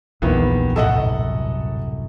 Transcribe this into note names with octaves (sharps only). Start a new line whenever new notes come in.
D1 A#1 E2 D#3 E3 G3 B3 B5
C2 F#2 A2 A4 D#5 F#5